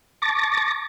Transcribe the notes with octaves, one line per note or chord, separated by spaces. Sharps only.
A5 C#6 D6 A6 A#6